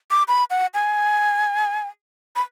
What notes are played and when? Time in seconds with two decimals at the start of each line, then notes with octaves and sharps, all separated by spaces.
0.11 D6
0.28 B5
0.50 F#5
0.74 G#5
2.36 B5